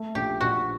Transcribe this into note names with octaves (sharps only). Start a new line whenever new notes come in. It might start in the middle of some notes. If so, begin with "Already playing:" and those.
Already playing: A3
A#1 G4
A#1 F#4